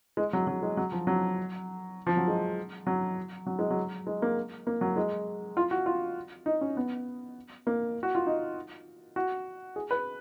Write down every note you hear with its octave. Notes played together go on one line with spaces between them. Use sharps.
G#3
F#3
F#3
G#3
F#3
F3
F#3
F3
F#3
G#3
F#3
F#3
G#3
F#3
G#3
A#3
A#3
F#3
G#3
F4
F#4
F4
D#4
C#4
B3
A#3
F#4
F4
D#4
F#4
G#4
B4